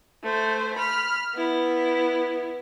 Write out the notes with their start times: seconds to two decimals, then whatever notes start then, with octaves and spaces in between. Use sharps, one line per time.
0.23 A3 C5
0.77 B5 F6
1.35 B3 E4